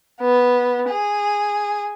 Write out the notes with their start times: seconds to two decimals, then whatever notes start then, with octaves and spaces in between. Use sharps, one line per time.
0.21 B3
0.90 G#4